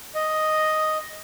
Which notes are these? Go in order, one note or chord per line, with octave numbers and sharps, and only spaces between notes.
D#5